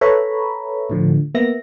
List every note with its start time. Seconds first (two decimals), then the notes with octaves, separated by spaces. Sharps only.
0.01 A4 B4 C#5 E5 A#5 B5
0.90 A2 D3 F3
1.35 A#3 B3 E5 A#6